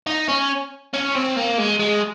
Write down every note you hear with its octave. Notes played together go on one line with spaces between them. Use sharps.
D#4
C#4
C#4
C4
A#3
G#3
G#3